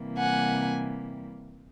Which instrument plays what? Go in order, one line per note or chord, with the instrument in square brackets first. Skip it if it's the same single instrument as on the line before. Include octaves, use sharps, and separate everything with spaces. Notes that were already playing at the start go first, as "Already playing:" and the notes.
Already playing: [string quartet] C3 E3 G3 A#3
F#5 G#5